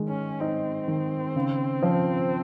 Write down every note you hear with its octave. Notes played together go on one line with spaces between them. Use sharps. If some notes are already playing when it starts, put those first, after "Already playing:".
Already playing: D#3 G#3
C#4
C4 D#4
D#3
C#3
F3